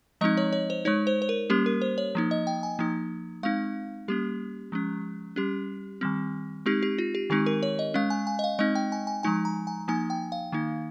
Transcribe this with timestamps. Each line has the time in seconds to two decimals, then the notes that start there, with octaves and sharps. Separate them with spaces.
0.21 F3 G#3 C4 D#4 D#5
0.37 C#5
0.53 C#5
0.70 C5
0.85 G#3 D#4 C#5
1.07 C5
1.22 C5
1.29 A#4
1.50 G3 A#3 C#4 G4
1.66 A#4
1.82 C5
1.98 C#5
2.15 F3 A#3 D#4
2.31 D#5
2.47 G5
2.63 G#5
2.79 F3 A#3 D#4
3.43 G#3 C4 D#4 F5
4.08 G3 A#3 C#4 G4
4.72 F3 G#3 C#4
5.36 G3 C#4 G4
6.01 D#3 G3 C4
6.66 G#3 C4 D#4 G4
6.83 G4
6.98 F4
7.15 G4
7.30 D#3 G#3 C4 D#4 G4
7.46 A#4
7.63 C#5
7.79 D#5
7.94 G#3 C#4 F5
8.10 G#5
8.27 G#5
8.39 D#5
8.44 F5
8.59 G#3 C4 D#4 D#5
8.75 G5
8.92 G#5
9.07 G#5
9.23 F3 G#3 D#4 G#5
9.45 A#5
9.67 G#5
9.88 F3 A#3 D#4 G#5
10.10 G5
10.32 F5
10.52 D#3 A#3 D#4